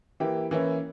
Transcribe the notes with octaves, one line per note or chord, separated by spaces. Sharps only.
E3 A#3 E4 G4
E3 A#3 C#4 E4